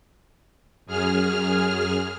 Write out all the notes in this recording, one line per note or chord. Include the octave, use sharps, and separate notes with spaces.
F#2 G#4 F6